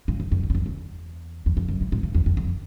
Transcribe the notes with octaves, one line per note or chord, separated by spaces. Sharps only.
G2
F2
F#2
F2
F#2
F2
E2
E2
F2
F#2
G2
G#2
G2
E2
F2
F2